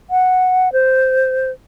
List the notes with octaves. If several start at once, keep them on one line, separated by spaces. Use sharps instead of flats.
F#5
C5